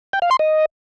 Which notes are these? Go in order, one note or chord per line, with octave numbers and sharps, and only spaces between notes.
G5
F5
C6
D#5